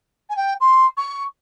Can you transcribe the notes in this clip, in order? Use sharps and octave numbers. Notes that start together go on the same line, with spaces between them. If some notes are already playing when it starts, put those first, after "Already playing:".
G#5
G5
C6
C#6